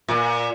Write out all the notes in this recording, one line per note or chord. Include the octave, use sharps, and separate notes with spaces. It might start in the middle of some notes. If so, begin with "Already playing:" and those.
A#2